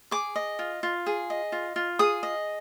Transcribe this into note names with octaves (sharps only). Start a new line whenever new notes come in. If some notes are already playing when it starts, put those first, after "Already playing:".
G#4 D6
D#5
F4
F4
G#4
D#5
F4
F4
G#4 D#6
D#5